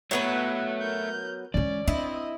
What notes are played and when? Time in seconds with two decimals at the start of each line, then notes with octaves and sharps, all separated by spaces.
0.11 F#3 A3 B3 B4 C#5
0.81 A#4 G6
1.54 E3 G#3 C#4 D5
1.88 C4 D4 E4 D#5